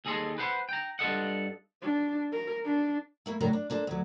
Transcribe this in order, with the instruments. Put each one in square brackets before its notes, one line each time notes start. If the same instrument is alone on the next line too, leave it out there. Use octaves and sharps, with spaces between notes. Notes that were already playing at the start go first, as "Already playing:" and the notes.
[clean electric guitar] D#2 G#4 A4 D#5 C6
B4 C5 F#5 C6
G5 A#5
G2 F4 A4 D#5 F#5
[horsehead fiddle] D4
A#4
D4
[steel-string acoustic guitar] A3 A#3 E4
A2 C#3 F#3 D4 A#4 A#5
D4
A#3 D4 A4 C5
D2 F#3